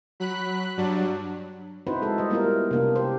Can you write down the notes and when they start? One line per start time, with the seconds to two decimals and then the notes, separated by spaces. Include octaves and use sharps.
0.20 F#3 B5 F#6
0.77 G2 F#3 D4
1.87 C4 D#4 E4 F#4 B4 C5
2.02 G#3 A4
2.18 G3 D#5
2.30 G3 A#3 B3 E4 F4 A#4
2.71 C3 A#3 D4
2.95 G4 C5